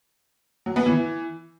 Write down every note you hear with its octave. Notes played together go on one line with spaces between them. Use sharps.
F#3
B3
E3